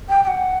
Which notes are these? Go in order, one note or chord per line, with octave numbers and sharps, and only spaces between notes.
G5
G5
F#5